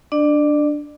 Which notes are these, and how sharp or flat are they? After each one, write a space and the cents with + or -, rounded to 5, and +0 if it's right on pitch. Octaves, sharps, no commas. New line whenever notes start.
D4 +0 D5 +35